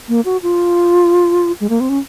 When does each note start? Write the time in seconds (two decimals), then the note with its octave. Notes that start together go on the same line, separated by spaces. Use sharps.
0.09 A#3
0.25 F#4
0.43 F4
1.61 G#3
1.69 A#3
1.80 C4
1.89 C#4